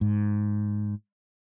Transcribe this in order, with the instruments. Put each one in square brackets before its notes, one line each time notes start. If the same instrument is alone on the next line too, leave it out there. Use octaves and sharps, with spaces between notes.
[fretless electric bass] G#2